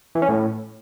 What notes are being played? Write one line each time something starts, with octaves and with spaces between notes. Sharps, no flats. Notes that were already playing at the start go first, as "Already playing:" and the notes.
E3
C#4
A2